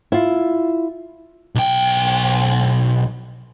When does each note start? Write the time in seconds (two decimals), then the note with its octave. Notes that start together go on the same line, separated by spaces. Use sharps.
0.12 E4 F4
1.55 B1 G5